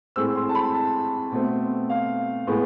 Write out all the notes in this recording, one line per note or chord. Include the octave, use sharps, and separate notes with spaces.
A2 G#3 C4 E6
C6
A5
B5
A5
B2 A3 C4
F5
A2 G#3 B3